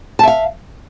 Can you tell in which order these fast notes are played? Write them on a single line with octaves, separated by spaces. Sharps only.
A5 E5 F5